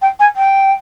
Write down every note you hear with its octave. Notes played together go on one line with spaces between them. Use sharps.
G5
G#5
G5